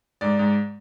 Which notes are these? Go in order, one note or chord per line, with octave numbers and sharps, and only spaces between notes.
G#2 D5
G#2